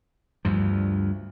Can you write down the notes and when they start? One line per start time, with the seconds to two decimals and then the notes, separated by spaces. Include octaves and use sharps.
0.45 D2 G2 F3